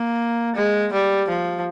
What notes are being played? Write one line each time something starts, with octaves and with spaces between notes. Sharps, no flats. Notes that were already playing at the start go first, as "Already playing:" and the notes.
Already playing: A#3
G#3
G3
F3